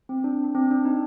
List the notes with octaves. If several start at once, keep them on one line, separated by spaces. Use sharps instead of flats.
C4
D4
D4
C4
D4
D#4